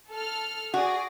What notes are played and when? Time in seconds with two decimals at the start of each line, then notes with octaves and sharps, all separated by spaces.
0.10 A4 F6
0.74 F#4 G#4 D5 A#6